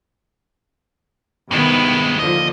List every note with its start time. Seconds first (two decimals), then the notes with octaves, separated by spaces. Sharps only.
1.51 G2 C3 D#3 G#3 B3 E4
2.19 D#2 D3 F3 D#5